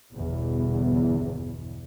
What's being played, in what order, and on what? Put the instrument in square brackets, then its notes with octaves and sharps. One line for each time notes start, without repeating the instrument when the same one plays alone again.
[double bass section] G1 E2 B2